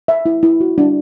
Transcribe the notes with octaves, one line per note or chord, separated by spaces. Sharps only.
E5
E4
E4
F#4
D4